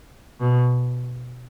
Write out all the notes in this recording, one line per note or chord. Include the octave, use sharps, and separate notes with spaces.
B2